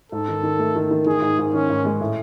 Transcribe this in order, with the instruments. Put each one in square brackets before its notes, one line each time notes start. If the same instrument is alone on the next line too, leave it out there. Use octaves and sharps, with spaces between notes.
[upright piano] G#2 [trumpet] A4
[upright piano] D#3
D#3
A3
D#3
D#3
[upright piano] D#3 [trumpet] G#4
[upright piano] G#2
G#2
[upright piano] D#3 [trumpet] C#4
[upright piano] G#2
G#3
A2